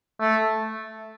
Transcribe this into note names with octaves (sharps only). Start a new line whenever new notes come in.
A3